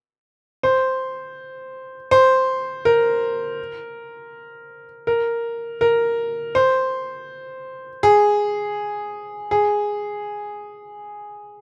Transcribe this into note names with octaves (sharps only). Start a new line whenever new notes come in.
C5
C5
A#4
A#4
A#4
C5
G#4
G#4